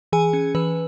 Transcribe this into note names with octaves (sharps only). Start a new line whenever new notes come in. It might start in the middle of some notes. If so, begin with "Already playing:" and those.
E3 G#4 G#5
C#4
E3 B4